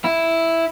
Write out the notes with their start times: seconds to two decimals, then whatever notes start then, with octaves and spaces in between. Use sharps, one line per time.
0.04 E4